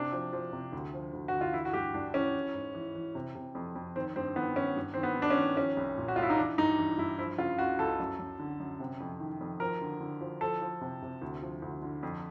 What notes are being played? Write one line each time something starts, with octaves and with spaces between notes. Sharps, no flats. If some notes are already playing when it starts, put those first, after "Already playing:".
Already playing: C3 D4
F3
F3
C3
D2
F3
D2
F#4
D2
F4
E3 E4
F#4
G2 G4
G2 D4
E3 C#4
E3
G#2
E3
E3
C3
C3
F2
F2
D#3 C4
G2 C4
D#3 B3
D#3 C#4
G2
D#3 C4
B3
D#3
D4
C#4
D#3
F3 C#4
C2
A#2
F#4
C2 F4
E4
D#4
E3 D4
G2 D#4
E3
G2 E4
F3 E4
C#3 F4
C#2 F#4
C#2 A4
F#2
F#2
D3
F#2
C3
F2
D#3
F2
F3 A#4
D3
D3
F3
F3 A4
F3
C3
C3
D2
F3
D2
D3
F2